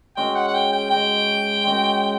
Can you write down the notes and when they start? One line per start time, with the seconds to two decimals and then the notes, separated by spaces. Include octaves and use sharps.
0.17 G#3 C#4 F#4 G5
0.35 F#5
0.48 F#5
0.54 G5
0.73 G5
0.90 G#3 C#4 F#4 G5
1.65 G#3 C#4 F#4